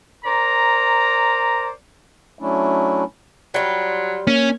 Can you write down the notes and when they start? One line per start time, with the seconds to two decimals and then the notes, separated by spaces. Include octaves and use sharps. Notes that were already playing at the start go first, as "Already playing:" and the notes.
0.24 A#4 C5 D5 A#5
2.39 F#3 A3 C#4 D4 E4
3.54 F#3 G3 F4
4.27 A#3 C#4